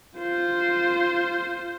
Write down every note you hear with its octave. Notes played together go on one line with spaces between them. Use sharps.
F4 C5